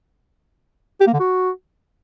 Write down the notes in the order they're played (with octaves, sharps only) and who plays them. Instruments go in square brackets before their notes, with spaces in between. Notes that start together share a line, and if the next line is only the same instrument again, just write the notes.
[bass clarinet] G4
A#3
D3
F#4